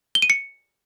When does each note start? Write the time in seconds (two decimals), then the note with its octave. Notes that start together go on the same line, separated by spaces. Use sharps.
0.15 G7
0.22 D#7
0.30 C#7